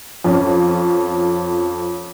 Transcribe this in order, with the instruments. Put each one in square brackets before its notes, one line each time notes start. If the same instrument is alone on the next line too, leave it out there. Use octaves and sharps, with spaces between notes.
[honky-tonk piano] F2 C#4